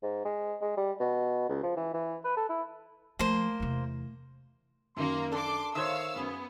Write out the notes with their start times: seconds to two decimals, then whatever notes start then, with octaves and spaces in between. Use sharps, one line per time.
0.03 G#2
0.25 G#3
0.62 G#3
0.77 G3
1.00 B2
1.49 C#2
1.63 F3
1.76 E3
1.94 E3
2.24 B4
2.37 A4
2.49 E4
3.19 F3 A3 A#3 C5
3.60 E2 C3
4.97 F#2 D#3 A#3 A#4 C6
5.32 D4 A4 D5 C6 D6
5.75 D#3 C5 C#5 E5 F5 D#6 E6 G#6
6.16 F#2 B3 G#4